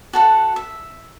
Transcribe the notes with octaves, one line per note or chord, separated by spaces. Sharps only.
F#4 A4 F#5
E5